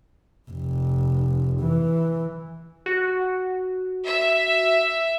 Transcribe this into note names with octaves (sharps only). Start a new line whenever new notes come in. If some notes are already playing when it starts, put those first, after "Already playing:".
F1
E3
F#4
E5